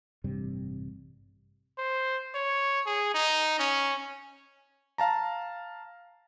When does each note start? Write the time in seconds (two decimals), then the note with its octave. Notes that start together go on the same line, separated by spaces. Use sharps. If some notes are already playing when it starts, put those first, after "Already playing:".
0.24 A1 G2 C3 G3
1.78 C5
2.34 C#5
2.86 G#4
3.14 D#4
3.59 C#4
4.98 F5 A5 A#5